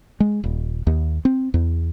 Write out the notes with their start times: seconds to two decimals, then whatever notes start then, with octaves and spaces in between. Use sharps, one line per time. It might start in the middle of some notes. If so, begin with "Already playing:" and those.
0.20 G#3
0.44 D#1
0.87 D#2
1.25 C4
1.54 E2